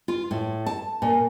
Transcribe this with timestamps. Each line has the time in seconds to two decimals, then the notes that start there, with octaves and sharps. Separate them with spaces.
0.08 F4
0.31 A2
0.66 A5
1.02 A#2